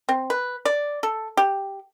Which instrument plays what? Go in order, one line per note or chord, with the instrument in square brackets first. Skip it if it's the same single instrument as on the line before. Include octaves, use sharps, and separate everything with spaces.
[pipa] C4
B4
D5
A4
G4